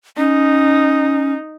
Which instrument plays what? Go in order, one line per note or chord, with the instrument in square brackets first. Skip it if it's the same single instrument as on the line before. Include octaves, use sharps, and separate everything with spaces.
[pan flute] C#4 [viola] D#4